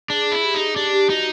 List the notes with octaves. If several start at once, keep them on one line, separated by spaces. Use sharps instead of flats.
D4 G#4
G#4
E4
G4
D#4
G#4
D4 G4
G4
D#4 F#4